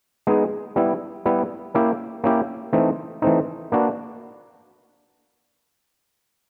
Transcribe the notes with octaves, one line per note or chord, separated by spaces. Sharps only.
G#3 B3 D#4 G#4
G3 B3 E4
G3 B3 E4
A#3 C#4 E4 G4
A#3 C#4 E4 G4
E3 A3 C4 D#4
E3 A3 C4 D#4
A#3 D4 F#4 B4